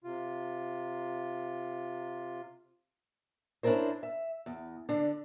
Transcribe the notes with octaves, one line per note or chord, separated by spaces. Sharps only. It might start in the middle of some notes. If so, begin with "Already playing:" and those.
C3 F4
C#4 D4 E4 A4 A#4 C5
E5
E2
D3 D4